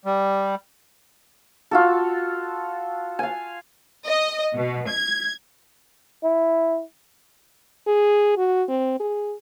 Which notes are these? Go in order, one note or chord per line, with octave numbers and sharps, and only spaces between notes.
G3
F4 F#4 A4
F5 G#5
D#5
B2
G#6
E4
G#4
F#4
C4
G#4